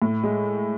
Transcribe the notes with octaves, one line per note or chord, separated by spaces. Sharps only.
A2
G#3